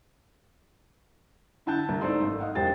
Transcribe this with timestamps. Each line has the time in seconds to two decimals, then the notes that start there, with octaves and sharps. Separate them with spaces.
1.66 D3 E4 F#5 A5 G6
1.89 C2
2.01 G#2 A3 A4 C5 D5 C6
2.21 G#1 A3
2.40 D#5 F5 F#5
2.55 E1 G4 C5 G5 A6